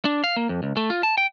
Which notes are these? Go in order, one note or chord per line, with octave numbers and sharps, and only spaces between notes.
D4
F5
A#3
F2
C#2
A3
F4
A5
G5